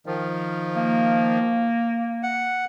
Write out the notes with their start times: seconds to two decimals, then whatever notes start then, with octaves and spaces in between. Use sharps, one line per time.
0.06 D#3 F3
0.76 A#3
2.23 F#5